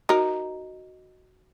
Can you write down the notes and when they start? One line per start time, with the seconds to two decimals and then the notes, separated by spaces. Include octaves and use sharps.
0.09 D#4 F#4 A#4